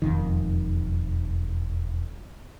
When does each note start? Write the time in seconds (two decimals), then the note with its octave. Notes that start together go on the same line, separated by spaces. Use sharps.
0.02 E1 F2 D#3